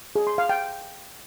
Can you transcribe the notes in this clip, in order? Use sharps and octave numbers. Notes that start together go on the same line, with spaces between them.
G#4
C6
F5
G5